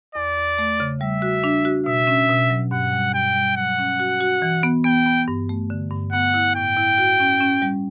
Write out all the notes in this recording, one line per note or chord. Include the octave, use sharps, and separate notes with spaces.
E2 D5
E2
A3
C#3
G3 E5
F#4
D4
F#4
B2 E5
C#4
B2
F#3
G2 F#5
G3
G2 G5
G3
F#3 F#5
C#4
F#4
F#4
E3
B3
B3 G5
B3
G2
A3
D3
G2
B3 F#5
E4
A2 G5
E4
F#4
C#4
C#4
G3